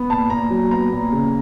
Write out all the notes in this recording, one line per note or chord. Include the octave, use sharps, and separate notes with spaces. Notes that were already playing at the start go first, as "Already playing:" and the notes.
Already playing: B3
A#2 A5
A#2 A#5
F#3
B3 A#5
A#2
C#3